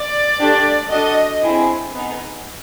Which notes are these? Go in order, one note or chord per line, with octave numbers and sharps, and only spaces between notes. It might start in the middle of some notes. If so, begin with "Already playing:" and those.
Already playing: D5
A3 D4 G4
D4 F#4 A4 D#5
C4 E4 G#4
B3 D#4 G#4